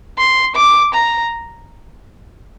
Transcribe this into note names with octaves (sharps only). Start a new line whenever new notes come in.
C6
D6
A#5